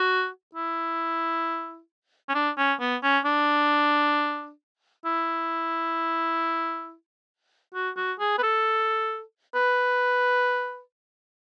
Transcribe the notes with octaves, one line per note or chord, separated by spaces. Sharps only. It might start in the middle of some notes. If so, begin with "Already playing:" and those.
Already playing: F#4
E4
C#4
D4
C#4
B3
C#4
D4
E4
F#4
F#4
G#4
B4
A4
B4